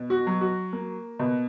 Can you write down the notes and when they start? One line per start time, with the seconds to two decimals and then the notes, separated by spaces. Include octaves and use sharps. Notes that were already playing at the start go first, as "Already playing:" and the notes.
Already playing: B2
0.10 F#4
0.27 F#3
0.41 F#4
0.73 A#3
1.19 B2